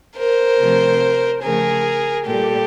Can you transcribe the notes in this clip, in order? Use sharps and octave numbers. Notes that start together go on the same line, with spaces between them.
A#4 C5
C3 F3 A3
C#3 F3 A3 G#4 A#4
A#2 G3 G4 A4